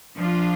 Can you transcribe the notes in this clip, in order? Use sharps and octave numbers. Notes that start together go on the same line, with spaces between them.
F3 D4 F4